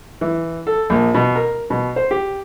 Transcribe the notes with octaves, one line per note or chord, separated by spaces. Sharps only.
E3
A4
A#1
B2
A#4
B2
C5
G4